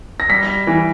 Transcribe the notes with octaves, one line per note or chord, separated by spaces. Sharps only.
A#6
G3 B6
E3